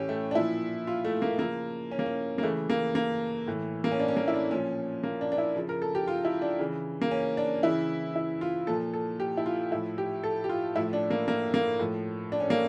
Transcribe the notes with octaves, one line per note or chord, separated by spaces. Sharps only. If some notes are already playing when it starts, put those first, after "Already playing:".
Already playing: A2 E3 C#4 G4
A3
D4
A#2 F3 E4
F4
A3
A#3
C#3 F3 A#3
C#4
A#3
C#4
A#3
C#3 E3 A3
A#3
A#3
A2 E3
A#3
C#4
D4
C#4
A#3
E4
D4
A#2 F3 C#4
A#3
D4
D4
E4
C#3 F3
A#4
A4
G4
F4
E4
D4
C#3 E3
A#3
C#4
D4
C#3 E3 E4
E4
F4
A#2 F3 A4
A4
G4
E4
F4
A2 F3 E4
G4
A4
G4
F4
A2 F3 E4
D4
A#3
A#3
A#3
A2 F3
D4
C#4
A#3